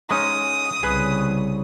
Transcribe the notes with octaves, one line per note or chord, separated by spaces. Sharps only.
G#3 C#4 D#4 D#6
C2 C#3 G#4 B4